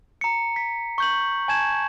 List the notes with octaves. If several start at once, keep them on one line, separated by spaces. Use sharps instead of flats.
A#5 C#7
B6
C#6 G6 F#7
G#5 A5 G#6 E7